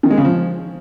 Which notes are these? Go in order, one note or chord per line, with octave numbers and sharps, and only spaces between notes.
D#3
G#3
C#3
F3